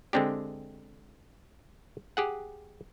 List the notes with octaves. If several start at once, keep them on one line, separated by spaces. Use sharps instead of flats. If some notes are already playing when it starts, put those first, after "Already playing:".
D3 G#3 C4 D4 G4
G4 G#4 F#5